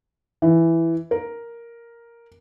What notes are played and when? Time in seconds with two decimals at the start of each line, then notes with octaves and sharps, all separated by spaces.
0.42 E3
1.11 A#4